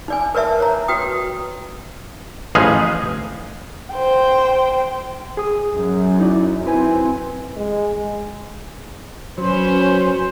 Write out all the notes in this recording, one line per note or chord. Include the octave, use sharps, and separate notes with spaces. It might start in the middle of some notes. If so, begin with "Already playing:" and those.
D#4 D5 G#5
A#4 B4 D5 E5 A5
C#5 A#5
F#4 B4 G5 D#6
A1 F3 D#4 G#4 B4 F5
C5 G5
G#4 D#6
F#2
D#4 E4 D5
C4 E4 B4 G#5
G#3
F#3 C#4 B4 C5